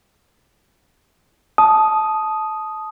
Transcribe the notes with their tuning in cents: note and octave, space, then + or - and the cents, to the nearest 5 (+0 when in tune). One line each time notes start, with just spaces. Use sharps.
A5 -20 D#6 +0